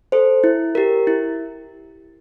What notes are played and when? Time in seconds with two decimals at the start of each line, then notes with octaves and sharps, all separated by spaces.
0.12 A4 C5
0.44 E4
0.75 G4 A#4
1.07 E4